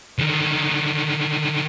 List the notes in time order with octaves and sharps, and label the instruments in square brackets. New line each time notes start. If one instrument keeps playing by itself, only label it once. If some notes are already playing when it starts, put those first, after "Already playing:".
[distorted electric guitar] D3 D#3